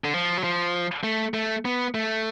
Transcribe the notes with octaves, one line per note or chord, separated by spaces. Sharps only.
D3
F3
F#3
F3
A3
A3
B3
A3